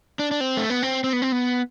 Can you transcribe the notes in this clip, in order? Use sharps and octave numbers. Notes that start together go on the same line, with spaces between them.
D4
D4
C4
A3
B3
C4
C4
B3
C4
B3